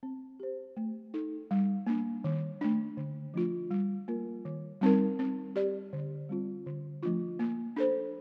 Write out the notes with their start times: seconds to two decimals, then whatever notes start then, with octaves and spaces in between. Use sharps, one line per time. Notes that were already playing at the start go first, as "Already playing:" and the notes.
0.03 C4
0.40 G4 C5
0.77 A3
1.14 D#4 A4
1.51 G3
1.87 A#3 D4
2.24 D#3
2.61 A3 D4
2.97 D3
3.34 F3 A3 D4 F4
3.71 G3
4.08 A#3 F4 A#4
4.45 D#3
4.81 G3 C4 D#4 A#4
5.19 C4
5.56 G4 D5
5.93 D3
6.29 G3 C4 F4
6.66 D3
7.03 F3 A3 D4 F4
7.39 A#3
7.76 D4 A4 C5